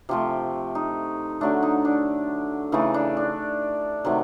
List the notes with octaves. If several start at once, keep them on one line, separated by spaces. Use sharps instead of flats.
C3 F3 A3 G4
D#4
D3 F#3 A3 D4
D#4
D4
C#3 E3 A3 D#4
D4
D4
C3 D#3 F#3 A3